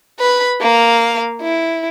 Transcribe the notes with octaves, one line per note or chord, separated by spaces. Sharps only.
B4 B5
A#3 F5
E4